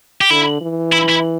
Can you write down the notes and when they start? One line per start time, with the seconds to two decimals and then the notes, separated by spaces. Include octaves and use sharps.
0.21 G4
0.31 D3 E4
0.61 E3
0.93 E4
1.10 E4